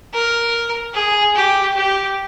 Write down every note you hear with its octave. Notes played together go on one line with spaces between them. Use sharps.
A#4
G#4
G4
G4